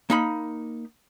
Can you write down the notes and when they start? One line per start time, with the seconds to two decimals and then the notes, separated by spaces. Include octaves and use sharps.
0.10 A#3 D#4 B5